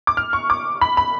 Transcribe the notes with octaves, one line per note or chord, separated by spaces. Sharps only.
D6
F6
C#6
D6
B5
B5